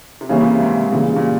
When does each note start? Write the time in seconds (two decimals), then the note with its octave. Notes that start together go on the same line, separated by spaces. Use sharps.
0.21 C3
0.29 C#3 E3 G3 A#3 C#4 E4
0.41 C3
0.60 G#2
0.92 A#2 C#3 E3 G3
1.16 A#2